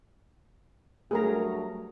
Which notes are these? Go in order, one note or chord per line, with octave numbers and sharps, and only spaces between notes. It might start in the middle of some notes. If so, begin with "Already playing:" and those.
G2 F#3 A3 G#4 A#4 A#5